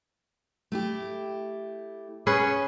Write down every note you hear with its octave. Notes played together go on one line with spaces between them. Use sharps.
A3 E4 G4
C#4 G#4 B4